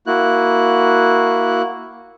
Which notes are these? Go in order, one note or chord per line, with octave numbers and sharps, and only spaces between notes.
A#3 E4 F#4 F#6